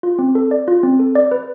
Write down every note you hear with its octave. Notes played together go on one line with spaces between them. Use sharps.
F4
C4
A4
D5
F4
C4
A4
D5
B4